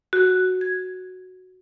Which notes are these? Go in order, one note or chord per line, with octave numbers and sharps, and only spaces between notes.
F#4
G#6